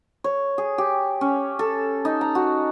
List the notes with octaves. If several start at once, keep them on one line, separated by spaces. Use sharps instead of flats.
C#5
G#4
G4
C#4
A4
D#4
A#5
F#4